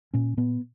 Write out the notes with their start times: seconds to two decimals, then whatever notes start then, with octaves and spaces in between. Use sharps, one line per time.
0.14 A#2 C#4
0.37 A#2 B3